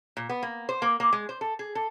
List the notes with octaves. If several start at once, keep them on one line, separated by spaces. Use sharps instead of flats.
A#2
B3
A#3
C5
A#3
A#3
G#3
C5
A4
G#4
A4